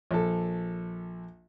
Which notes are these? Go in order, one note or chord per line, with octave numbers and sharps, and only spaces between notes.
A#1 A4